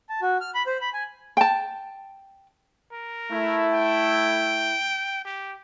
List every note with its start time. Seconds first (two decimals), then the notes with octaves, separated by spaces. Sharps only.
0.09 A5
0.22 F#4
0.41 F6
0.55 B5
0.67 C5
0.81 B5
0.93 G#5
1.37 G5 A5
2.92 A#4
3.31 A3 E4
3.72 G5
5.25 G4